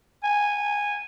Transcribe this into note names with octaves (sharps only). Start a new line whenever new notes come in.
G#5